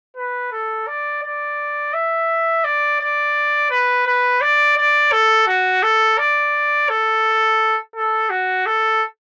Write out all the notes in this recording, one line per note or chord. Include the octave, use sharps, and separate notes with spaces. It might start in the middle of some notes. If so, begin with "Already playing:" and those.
B4
A4
D5
D5
E5
D5
D5
B4
B4
D5
D5
A4
F#4
A4
D5
A4
A4
F#4
A4